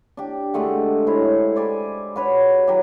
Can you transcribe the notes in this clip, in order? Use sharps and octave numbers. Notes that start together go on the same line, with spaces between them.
D4 G4
D3 G#3 A3 F#5
E4 C5 C#5
C5 D5 G#5 B5
F#4 B4 C#5
F#3 G4